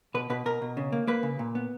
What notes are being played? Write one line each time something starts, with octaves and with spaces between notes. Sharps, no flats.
B2 B4
B2 B4
B2 A#4
B2
C#3
A#3
A#3 B4
C#3
A#2
B3